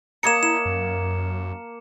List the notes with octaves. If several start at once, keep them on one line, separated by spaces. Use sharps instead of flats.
A#3 C#5 D#5 A5 A#5 C#7 E7
E4 E7
F#2